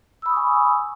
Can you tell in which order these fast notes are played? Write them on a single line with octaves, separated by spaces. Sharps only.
E6 B5 D#6 C#6 G#5